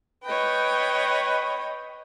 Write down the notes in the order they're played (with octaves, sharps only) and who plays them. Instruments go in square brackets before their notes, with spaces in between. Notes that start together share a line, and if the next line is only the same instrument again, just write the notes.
[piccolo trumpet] B4 [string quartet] C#5 D#5 G5